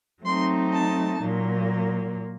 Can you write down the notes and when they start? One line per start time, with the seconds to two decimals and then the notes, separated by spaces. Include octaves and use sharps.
0.24 F#3 A3 C4 D#4 C6
0.73 A5
1.22 A#2 F#3 A#3